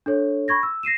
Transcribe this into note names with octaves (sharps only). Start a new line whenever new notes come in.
D4 A4 C#5
B5 C#6 G#6 A#6
E6
A#6 C7 D#7 E7